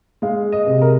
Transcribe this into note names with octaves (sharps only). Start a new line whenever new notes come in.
G#3 F5
D#5
C3
A#4